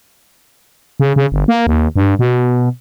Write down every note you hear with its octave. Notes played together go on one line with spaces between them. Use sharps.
C#3
C#3
G1
A#3
D#2
G2
B2